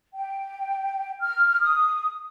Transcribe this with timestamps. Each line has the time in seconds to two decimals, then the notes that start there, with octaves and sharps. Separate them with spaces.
0.13 G5
1.20 F6
1.59 D#6